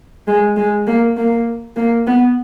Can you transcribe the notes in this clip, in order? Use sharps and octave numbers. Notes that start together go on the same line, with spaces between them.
G#3
G#3
A#3
A#3
A#3
B3